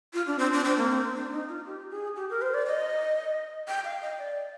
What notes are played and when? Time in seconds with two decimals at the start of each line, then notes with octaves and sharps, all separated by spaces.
0.14 F4
0.27 D4
0.39 C4
0.53 D4
0.64 C4
0.77 A#3
0.91 C4
1.15 D4
1.32 D#4
1.49 F4
1.66 G4
1.91 G#4
2.16 G4
2.30 A#4
2.42 C5
2.54 D5
2.67 D#5
3.68 G5
3.84 F5
4.02 D#5
4.19 D5